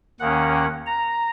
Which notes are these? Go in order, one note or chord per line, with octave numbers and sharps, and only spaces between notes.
D#2 D#3 A#3 C#4 F#5
A#5